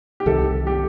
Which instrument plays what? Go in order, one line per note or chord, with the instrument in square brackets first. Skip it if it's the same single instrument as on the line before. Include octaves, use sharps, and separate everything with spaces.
[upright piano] G4
[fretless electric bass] C2 C3 D#3 [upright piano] A4
[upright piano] G4